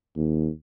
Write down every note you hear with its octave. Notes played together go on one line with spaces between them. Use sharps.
D#2